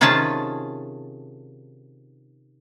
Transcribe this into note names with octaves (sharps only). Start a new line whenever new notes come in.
C3 D#3 C#4 F4 G#4 A5